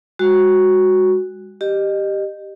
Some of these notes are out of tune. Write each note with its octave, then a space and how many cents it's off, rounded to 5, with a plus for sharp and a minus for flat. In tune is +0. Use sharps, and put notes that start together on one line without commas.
G#3 -40 F#4 +0
G4 +0 D#5 -25